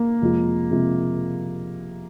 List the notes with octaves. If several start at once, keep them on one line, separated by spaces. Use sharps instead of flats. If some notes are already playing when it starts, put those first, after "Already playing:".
Already playing: A#3
F2 C3 G#3 F4
F2 C3 G#3 F4